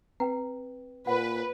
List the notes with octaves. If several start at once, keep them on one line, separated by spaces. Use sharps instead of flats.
C4 B4 G5
A#2 B4 F#5